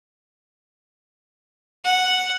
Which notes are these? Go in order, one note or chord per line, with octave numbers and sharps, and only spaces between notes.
F#5